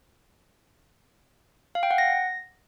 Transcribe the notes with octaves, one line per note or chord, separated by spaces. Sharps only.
F5
G5
F#5
A#6